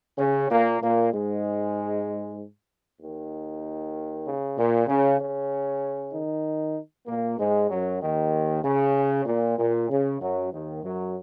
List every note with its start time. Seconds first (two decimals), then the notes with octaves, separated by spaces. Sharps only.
0.18 C#3 C#4
0.50 A#2 A#3
0.81 A#2 A#3
1.12 G#2 G#3
3.00 D#2 D#3
4.25 C#3
4.57 A#2
4.88 C#3
5.19 C#3 C#4
6.13 D#3 D#4
7.07 A#2 A#3
7.39 G#2 G#3
7.70 F#2 F#3
8.01 D#2 D#3
8.63 C#3
9.26 A#2
9.58 A#2
9.89 C#3
10.20 F#2 F#3
10.52 D#2 D#3
10.83 F#2 F#3